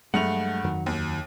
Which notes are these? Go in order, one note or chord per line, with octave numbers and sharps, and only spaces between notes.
G2 F#3 G#3 A3 F#5 F7
F2 D#3 F#3
D#2